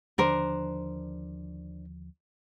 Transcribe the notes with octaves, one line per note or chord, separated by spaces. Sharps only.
D#2 D3 F3 D4 A#4 C5